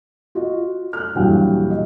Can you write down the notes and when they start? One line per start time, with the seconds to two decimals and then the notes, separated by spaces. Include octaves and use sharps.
0.35 F4 F#4 D#5
0.93 F6 F#6
1.15 D#1 G2 E3 F#3 F5 G5
1.70 D#5